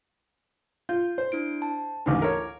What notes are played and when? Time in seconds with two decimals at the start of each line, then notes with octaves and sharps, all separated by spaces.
0.89 F4 G6
1.18 C5
1.32 D4 E4 D7
1.62 A5
2.06 A1 D2 G#2 E4 D6
2.22 A#4 C#5